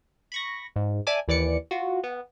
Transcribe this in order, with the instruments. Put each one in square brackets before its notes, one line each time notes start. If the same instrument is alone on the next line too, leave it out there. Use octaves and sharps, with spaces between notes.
[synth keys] B5 C#6 A#6
G#2
D5 E5 G#5 A5 D6
D#2 E3 D5 D6 C#7
F4 F#4
B3